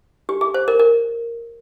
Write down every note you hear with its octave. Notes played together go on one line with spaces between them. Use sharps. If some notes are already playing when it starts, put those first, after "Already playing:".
G4
G#4
C5
A#4
A#4